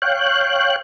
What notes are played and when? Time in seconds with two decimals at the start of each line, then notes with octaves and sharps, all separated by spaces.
0.02 C#5 F5 G5 F#6